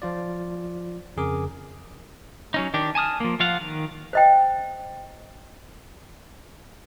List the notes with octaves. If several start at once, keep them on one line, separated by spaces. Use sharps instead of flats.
F3 F4 D5
F2 C#3 G#4 A#4 D6
F#3 C#4 D#4
D#3 D4 G4
G#5 A5 D#6 F6
F3 A#3
F3 F4 F5 F#5
D#3
C5 D#5 G5